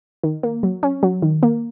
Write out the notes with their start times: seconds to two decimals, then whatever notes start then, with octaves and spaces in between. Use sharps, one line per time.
0.23 D#3
0.43 A#3
0.63 F#3
0.83 C#4
1.03 F#3
1.22 D#3
1.43 A#3